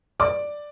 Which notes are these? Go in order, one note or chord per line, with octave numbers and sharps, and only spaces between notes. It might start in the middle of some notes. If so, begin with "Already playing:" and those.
D5 D6